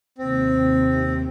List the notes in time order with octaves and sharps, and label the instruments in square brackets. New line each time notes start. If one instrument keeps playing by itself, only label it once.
[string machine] D#2 C3 [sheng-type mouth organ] C4